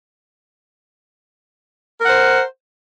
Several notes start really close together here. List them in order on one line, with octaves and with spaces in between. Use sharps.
A#4 F#5 C5